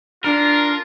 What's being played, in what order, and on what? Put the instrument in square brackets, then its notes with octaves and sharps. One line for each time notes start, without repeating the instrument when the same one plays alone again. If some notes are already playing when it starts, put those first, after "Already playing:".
[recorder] D4 [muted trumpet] F4 [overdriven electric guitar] A#4